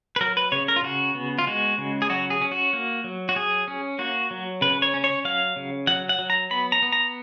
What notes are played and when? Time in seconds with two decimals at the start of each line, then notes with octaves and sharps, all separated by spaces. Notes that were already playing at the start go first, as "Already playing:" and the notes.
0.16 B4
0.21 F#3 A#4
0.37 B4
0.52 C#3 C#5
0.68 A#4
0.76 F4
0.83 C#3 F#4
1.15 B3
1.39 F4
1.47 G#3 F#4
1.78 C#3
2.02 G#4
2.10 F#3 F#4
2.30 G#4
2.41 C#4
2.52 F#4
2.73 A#3
3.04 F#3
3.29 F#4
3.36 F#3 G#4
3.68 C#4
3.99 A#3 F#4
4.31 F#3
4.61 C#3 B4
4.82 C#5
4.94 C#4
5.04 C#5
5.24 F#3 F5
5.56 C#3
5.87 F#3 F#5
6.09 F#5
6.19 F#3
6.30 A#5
6.51 B3 B5
6.72 A#5
6.82 B3
6.92 A#5